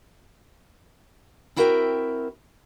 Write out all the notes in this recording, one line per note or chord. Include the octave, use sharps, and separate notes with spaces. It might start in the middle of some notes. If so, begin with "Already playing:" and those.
C4 E4 F#4 A#4 E5 G5